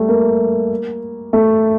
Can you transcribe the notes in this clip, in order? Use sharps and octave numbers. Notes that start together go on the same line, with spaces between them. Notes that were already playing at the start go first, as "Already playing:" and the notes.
Already playing: G3 A3
A#3
A3